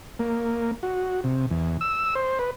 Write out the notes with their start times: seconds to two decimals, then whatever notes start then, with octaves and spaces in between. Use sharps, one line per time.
0.19 A#3
0.83 F#4
1.24 C3
1.50 E2
1.81 E6
2.15 C5
2.39 B4